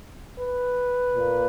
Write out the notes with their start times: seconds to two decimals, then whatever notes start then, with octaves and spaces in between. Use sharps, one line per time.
0.40 B4
1.15 A#2 A#3